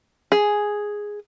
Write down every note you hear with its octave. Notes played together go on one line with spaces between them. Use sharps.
G#4